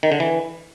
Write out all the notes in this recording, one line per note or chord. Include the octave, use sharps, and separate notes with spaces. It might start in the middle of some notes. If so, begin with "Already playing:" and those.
D#3
D3
E3